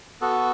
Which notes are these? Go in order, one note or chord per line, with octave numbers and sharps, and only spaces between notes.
B3 F#4 A4